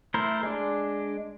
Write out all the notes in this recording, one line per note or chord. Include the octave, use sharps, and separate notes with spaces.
A3 E4 A#4 C5
G#3 D4